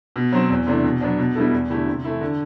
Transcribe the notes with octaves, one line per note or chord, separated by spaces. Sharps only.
B2
F#3 C4
E2
C3 E3 A3 D4
B2
F#3 B3 D4
B2
G3 B3 E4 A4
E2
D3 A3 E4 G4
C3
E3 A3 E4
D3